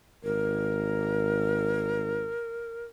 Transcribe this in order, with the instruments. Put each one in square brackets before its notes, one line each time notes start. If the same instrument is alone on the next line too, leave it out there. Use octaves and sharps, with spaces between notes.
[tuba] G#1 [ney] A#4